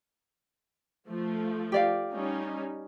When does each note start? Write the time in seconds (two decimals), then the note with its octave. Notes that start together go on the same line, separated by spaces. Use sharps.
1.08 F3 A3
1.72 G4 D5 F5
2.11 G3 C#4 D#4